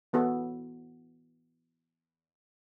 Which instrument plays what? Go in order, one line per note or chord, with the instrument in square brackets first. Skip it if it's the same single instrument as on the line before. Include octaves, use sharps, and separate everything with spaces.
[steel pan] E3 B3 F#4 A4